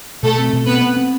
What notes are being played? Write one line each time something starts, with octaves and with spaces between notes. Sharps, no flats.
B2 A3 A4
C4
B2
B3 C4 B4
C4
C4